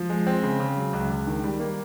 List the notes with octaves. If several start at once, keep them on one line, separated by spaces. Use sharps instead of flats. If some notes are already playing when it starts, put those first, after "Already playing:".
Already playing: F3
G#3
C4
C#3
C#3
F#3
C#2
C#2
D#3
G3
A#3